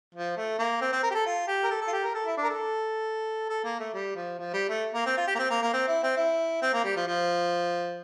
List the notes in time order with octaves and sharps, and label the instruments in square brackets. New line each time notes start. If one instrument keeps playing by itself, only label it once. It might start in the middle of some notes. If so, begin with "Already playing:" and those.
[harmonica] F3
A3
A#3
C4
C4
A#4
G4
A4
F4
G4
A#4
A4
A4
F4
G4
A#4
A4
E4
D4
A#4
A4
A4
A#3
A3
G3
F3
F3
G3
A3
A#3
C4
F4
G4
A#3
C4
A#3
A#3
C4
E4
C4
E4
C4
A#3
G3
F3
F3